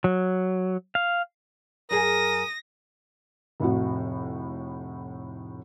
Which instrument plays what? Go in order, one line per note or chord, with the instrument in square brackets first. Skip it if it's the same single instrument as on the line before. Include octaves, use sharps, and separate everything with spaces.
[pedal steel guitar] F#3
F5
[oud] F#2 G#4 [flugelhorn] A#4 [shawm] D#6 [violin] A#6
[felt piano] F1 A2 F#4